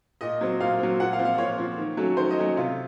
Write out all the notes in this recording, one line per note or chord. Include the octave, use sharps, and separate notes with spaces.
A#2 D#5
F#3 C4
A#2 F5
F#3 C4
A#2 F#5
F5
F3 C4
F5
A#2 C#5
F3 C4
D#3
F#3 A3 C#4
D#3 C5
D#5
F#3 A3 C#4
C3 F4